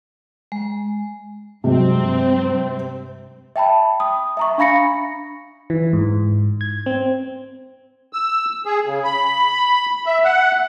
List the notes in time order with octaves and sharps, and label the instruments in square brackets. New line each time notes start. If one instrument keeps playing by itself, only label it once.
[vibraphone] G#3
[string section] G2 C4 [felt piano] C3 F#3 G#3
[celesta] E5 G5 A5 B5
D#6
E5 A#5 C#6
D4 F5 B5 A#6 C#7
[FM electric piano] E3
G#2
G#6
C4
[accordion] E6
G#4
C#3
B5
E5
F#5